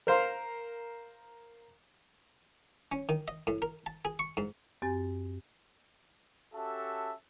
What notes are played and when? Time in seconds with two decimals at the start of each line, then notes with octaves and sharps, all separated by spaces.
0.07 A#4 C5 F5
2.92 C#4
3.09 D#3
3.28 D#5
3.47 A2
3.62 A#4
3.86 A5
4.05 G#4
4.19 C#6
4.37 G#2
4.82 F#2 C4 G4 G#5 A6
6.54 C#4 F#4 G4 A4 E5 A5